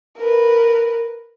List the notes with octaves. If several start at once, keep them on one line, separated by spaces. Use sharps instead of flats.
A#4 B4